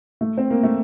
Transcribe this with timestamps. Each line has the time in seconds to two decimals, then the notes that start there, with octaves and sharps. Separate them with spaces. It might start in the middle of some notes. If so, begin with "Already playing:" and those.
0.21 A3
0.38 C4
0.51 A#3
0.63 A3